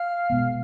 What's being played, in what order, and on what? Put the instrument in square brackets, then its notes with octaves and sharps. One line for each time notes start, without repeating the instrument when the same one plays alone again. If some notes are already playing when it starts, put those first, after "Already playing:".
Already playing: [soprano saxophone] F5
[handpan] B2 G#3 B3